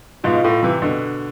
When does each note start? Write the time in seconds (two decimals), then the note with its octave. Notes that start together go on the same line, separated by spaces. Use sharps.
0.24 G#2 B2 F4
0.44 A2
0.63 C3 E3
0.82 B2 D3